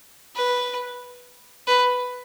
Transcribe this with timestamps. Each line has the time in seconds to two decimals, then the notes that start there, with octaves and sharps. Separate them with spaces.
0.36 B4
1.67 B4